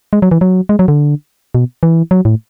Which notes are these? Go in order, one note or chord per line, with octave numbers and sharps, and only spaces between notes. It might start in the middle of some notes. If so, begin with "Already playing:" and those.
G#3
F#3
E3
F#3
G#3
F#3
D3
B2
E3
F#3
A2